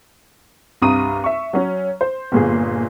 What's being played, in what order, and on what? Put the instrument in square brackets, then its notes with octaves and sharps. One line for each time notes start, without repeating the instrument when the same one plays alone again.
[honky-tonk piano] C2 G2 A#5 D#6 D#7
E5 C#6
F#3 C#4
C5
G1 A#2 G#4